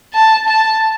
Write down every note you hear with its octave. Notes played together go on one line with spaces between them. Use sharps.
A5
A5